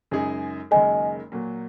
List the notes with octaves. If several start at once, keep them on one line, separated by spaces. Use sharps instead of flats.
F#2 C#3 G#3 D#4 G#4
F#1 F#2 D#3 G#3 D#5 G#5
A#2 F#3 A#3